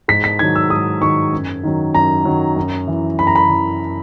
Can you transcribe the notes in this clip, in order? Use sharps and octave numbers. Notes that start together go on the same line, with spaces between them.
G#2 B6
B6
D#3 F#3 G#6
E6
G#2 D#6
D#3 F#3 C#6
F#2
D#3 F#3
F#2 A#5
D#3 F#3
F#2
E3
F#2 B5
A#5
B5
E3